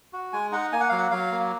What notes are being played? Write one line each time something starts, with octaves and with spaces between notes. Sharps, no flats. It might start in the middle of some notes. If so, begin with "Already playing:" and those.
F#4
G#3 G#5
D#4 F#5
A#3 G#5
F#5
F#3 F5
F#5
F#3 F5
A#3